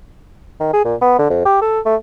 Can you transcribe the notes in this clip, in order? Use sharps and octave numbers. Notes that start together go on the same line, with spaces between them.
D#3
G#4
A#2
B3
D3
F2
G4
A4
A3